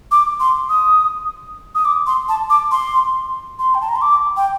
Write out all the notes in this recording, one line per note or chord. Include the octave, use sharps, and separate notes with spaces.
D6
C6
D#6
D#6
D6
C6
A5
D6
C6
C6
G5
A5
A#5
C6
D6
G5